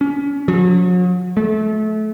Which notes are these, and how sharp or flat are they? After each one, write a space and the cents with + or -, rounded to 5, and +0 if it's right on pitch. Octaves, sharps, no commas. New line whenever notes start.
C#4 +30
F#3 -40
A3 -30